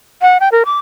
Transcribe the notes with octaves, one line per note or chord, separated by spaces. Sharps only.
F#5
G5
A#4
D6